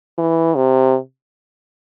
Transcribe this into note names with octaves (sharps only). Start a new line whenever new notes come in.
E3
C3